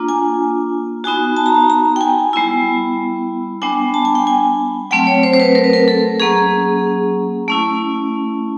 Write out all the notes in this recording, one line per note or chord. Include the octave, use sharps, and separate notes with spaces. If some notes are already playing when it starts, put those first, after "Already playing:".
Already playing: A#3 D4 F4
G#5
B3 D#4 F#4 G#5
A5
A#5
A5
A#5
G5
G#5
G3 B3 E4
G3 B3 D4 G#5
A5
G#5
G5
G#5
F#3 A3 C4 G5
C#5
C5
C5
B4
A#4
B4
A#4
A4
F#3 A#3 C#4 G#4
A3 C#4 E4